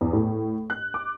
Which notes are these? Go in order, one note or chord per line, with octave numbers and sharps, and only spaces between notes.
E2
A2
F#6
D6